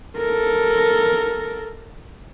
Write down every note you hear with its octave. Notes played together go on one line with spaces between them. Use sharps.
A4 A#4